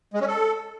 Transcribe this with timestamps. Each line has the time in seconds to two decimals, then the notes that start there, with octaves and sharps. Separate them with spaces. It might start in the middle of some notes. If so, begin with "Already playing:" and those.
0.14 G#3
0.21 C#4
0.27 A4